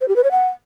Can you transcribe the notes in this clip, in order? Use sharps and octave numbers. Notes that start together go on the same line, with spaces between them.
C5
G4
B4
C#5
F#5